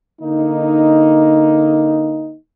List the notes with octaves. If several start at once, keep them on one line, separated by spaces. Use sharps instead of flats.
D3 A#3 D#4